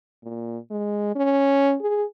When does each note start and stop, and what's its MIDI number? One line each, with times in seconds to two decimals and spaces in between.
0.23 0.58 46
0.71 1.13 56
1.16 1.76 61
1.81 2.04 68